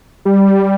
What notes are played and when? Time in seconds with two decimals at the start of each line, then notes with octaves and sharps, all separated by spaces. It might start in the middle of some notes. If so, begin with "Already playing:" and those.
0.25 G3